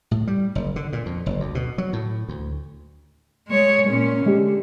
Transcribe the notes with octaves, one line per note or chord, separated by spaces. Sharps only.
A2
G3
F#1
D3
A#2
F2
F#1
D2
B2
F#3
A2
D2
G#3 C#5
A#2 C#4
D3 G#3 G4